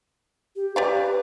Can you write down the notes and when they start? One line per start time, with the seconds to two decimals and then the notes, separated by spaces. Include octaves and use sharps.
0.56 G4
0.76 G4 B4 D5 F5